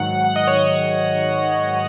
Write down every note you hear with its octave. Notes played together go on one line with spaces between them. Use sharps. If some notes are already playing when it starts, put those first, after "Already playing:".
Already playing: G#2 D#3 F#3 F#5
F#5
D#5
C#5
D#5